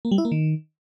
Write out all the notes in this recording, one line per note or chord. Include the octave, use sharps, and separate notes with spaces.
A#3
G3
E4
A#3
D#3